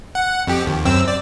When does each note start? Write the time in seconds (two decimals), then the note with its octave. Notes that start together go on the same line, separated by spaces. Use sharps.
0.15 F#5
0.47 F2 G4
0.66 D#2
0.85 F#2 C4 E6
1.08 D5